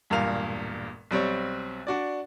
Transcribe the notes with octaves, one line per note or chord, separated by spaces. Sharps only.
E1 G2 A#2 A#4 F5 F7
B1 G3 C4 C#5
D4 F#4 D5